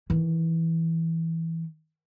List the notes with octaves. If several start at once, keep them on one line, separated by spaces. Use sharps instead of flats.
D#3 E3